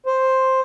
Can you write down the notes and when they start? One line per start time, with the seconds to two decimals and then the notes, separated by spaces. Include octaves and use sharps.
0.06 C5